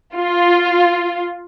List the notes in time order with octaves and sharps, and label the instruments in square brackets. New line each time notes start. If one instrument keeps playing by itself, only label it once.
[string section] F4